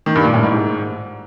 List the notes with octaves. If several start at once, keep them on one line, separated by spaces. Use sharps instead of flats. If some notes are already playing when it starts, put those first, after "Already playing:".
D#3
G2
A#2
A2
G#2